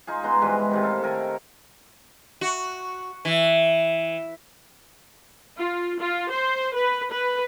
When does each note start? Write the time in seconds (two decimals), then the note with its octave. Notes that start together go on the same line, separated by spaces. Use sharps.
0.07 D#4 F4 G#4
0.23 G#3 B3 A#5 C6
0.42 G#2 E3 G3 G#3
0.71 A2 C3 D#3
0.83 A4 F5
1.03 D#3 A4 A#4 G#5
2.41 F#4
3.25 E3
5.57 F4
5.99 F4
6.30 C5
6.74 B4
7.10 B4